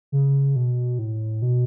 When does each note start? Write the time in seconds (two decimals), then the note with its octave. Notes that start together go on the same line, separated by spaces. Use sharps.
0.12 C#3
0.56 B2
0.99 A2
1.42 B2